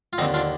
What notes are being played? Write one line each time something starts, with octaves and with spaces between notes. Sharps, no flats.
F4
D#2 D3 C4 D#4
D4 F4